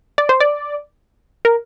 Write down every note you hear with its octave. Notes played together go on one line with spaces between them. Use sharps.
D5
C5
D5
A#4